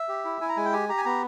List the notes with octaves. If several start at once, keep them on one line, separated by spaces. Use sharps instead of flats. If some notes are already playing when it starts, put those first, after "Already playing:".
Already playing: E5
G4
E4
E4 G#5
A#5
G#3 G#5
G5
G4 G#5
G4 A#5
G#5
B3 A#5